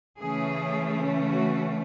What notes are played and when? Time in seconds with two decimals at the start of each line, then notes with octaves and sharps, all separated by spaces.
0.21 C#3 E3 A3 C#4 G#4
1.25 F#4